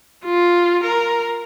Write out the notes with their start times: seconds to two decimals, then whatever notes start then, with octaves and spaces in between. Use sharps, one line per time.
0.25 F4
0.83 A#4